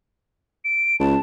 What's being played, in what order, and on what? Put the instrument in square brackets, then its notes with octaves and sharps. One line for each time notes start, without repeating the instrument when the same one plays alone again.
[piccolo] D7
[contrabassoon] C#2 [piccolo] A5